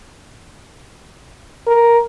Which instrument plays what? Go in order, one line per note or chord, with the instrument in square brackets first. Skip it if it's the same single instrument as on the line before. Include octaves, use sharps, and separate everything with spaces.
[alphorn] A#4